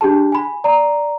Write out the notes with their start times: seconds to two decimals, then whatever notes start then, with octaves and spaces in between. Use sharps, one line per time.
0.01 D4 G4 G#4 A5
0.32 G#5 B5
0.64 D5 A#5